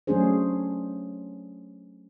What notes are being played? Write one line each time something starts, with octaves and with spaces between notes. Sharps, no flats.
F#3 A3 C#4 D4 G#4 C5